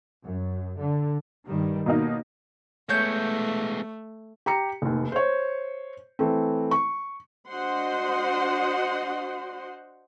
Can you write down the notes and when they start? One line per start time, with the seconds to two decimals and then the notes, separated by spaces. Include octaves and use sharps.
0.22 F#2
0.80 D3
1.46 G2 D#3 G3
1.86 D#2 B2 A#3 D#4
2.89 G#3 A3 B3 C#5 G6
4.46 G4 A#5 C#7
4.82 F1 D#2
5.12 C5 C#5
6.19 E3 A3 C4
6.71 C#6
7.51 D4 F#4 C5 D#5 F#5 C6